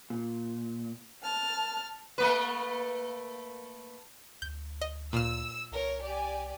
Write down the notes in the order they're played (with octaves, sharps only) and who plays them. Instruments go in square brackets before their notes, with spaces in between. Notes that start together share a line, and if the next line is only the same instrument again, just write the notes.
[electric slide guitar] A#2
[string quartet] A5 F6
[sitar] A3 A#3 B4
[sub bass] D2 [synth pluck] G6
[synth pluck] D#5
[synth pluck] A#2 F6 [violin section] E6
[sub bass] C2 [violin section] A#4 C#5
[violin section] G4 D5 G#5